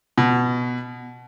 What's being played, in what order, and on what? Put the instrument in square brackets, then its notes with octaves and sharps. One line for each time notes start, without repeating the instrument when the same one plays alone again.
[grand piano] B2